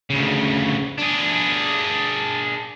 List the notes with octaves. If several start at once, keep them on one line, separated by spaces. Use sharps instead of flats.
D2 C#3
D4 G#4